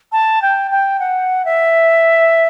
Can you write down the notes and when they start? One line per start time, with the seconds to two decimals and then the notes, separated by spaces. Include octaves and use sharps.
0.12 A5
0.42 G5
0.71 G5
1.00 F#5
1.45 E5